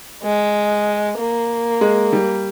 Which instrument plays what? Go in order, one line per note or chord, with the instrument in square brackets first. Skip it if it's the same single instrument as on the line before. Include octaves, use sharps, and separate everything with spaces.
[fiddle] G#3
A#3
[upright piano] G#3
G3